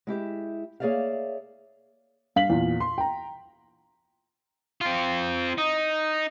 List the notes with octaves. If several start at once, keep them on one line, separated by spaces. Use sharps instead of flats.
G#3 E4 G4 E5
A#3 G#4 C#5 D5 E5 F5
G2 F5 B6 F#7
E2 A#2
C6
G5 A#5
C4 F4
D#4